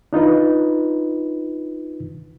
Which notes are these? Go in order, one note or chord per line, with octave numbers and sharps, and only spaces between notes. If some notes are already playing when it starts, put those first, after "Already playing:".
D4 D#4 F4 B4